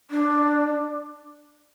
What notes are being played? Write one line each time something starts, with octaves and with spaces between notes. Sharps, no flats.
D4